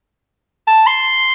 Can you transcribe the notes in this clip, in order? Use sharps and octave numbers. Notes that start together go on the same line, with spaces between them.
A5
C6